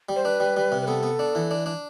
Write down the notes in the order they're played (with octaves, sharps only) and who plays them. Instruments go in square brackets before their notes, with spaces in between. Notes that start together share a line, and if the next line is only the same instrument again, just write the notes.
[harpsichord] G3
[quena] C5
[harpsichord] D4 [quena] B4
[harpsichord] G3
G3
C3
[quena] B4
[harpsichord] B3 [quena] A4
[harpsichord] B3
D4
E3
D4
D4